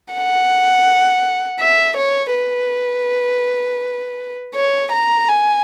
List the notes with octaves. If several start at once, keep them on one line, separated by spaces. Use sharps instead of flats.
F#5
E5
C#5
B4
C#5
A#5
G#5